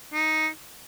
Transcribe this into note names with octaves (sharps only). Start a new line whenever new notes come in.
D#4